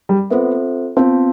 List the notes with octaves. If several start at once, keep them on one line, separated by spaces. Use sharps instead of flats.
G3
B3 C4 F4 A4 C5 E5
B3 C4 F4 C5 F5 A5